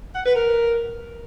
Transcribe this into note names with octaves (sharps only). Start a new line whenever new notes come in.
F#5
B4
A#4